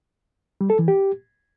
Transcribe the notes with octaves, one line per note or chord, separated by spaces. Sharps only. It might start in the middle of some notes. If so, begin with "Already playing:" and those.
G3
A4
E3
G4